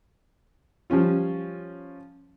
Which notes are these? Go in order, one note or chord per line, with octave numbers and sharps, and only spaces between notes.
F3 G3 C#4 F4